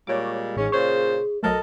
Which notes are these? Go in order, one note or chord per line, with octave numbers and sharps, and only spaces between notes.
A#2 G3 G#3 C#5 D6
A1 G#2 C#4 G#4
A#2 C#3 C5 C#5
B1 F#3 A3 A4 A#4 D#5